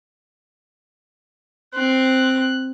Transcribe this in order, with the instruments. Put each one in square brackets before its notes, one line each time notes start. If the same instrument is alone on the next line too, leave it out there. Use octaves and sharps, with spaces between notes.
[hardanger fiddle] C4 [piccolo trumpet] F#6